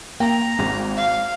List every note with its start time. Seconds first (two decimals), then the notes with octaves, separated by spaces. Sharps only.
0.20 A#3 G5 A#5
0.59 G#1 G#3
0.97 F5